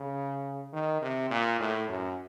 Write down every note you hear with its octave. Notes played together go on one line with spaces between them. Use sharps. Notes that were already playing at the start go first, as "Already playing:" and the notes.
Already playing: C#3
D#3
C3
A#2
A2
F#2